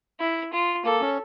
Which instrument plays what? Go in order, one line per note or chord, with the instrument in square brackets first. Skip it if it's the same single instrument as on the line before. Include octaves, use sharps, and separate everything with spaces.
[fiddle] E4
F4
[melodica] A#3 [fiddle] A4
[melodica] C#4